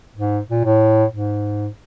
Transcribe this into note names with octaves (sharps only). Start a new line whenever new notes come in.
G#2
A#2
A2
G#2